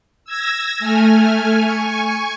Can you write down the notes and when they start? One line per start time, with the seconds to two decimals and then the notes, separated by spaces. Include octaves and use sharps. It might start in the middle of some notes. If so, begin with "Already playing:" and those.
0.24 E6 G#6 A#6
0.79 A3 G#5 F6
1.54 G#5 C#6